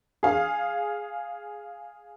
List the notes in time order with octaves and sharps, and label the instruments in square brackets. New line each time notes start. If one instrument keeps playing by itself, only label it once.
[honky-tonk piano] G#4 F5